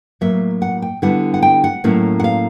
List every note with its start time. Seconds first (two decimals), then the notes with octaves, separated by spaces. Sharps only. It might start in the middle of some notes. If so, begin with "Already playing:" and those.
0.21 A2 F#3 A#3 E5
0.62 F#5
0.82 G5
1.02 D3 G3 B3 E4 F#5
1.34 F#5
1.43 G5
1.64 F#5
1.84 A2 F#3 A#3 C#4 E4
2.20 F#5
2.24 F5